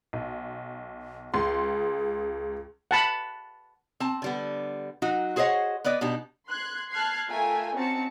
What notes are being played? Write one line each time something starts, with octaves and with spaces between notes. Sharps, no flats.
B1
C#2 G#4 C6
F#5 A5 B5
C4 A5
D3 G3 B3
F#3 D#4 F#4
F#4 G#4 C5 C#5 D#5 F#5
B3 B4 D5 D#5
B2 D4 D#4 G4
C6 F#6 G#6
A5 F6 F#6 G#6 C7
A3 F4 A#4 E5 G5 G#5
C4 C#4 D#4 F#4 A5 C#7